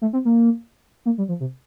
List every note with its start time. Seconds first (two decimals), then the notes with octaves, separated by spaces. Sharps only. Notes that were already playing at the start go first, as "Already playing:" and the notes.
0.02 A3
0.13 C4
0.25 A#3
1.06 A#3
1.18 G3
1.29 F3
1.40 C3